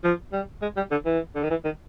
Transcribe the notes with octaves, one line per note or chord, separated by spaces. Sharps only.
F3
G3
G#3
G3
D3
E3
D3
D#3
E3
D#3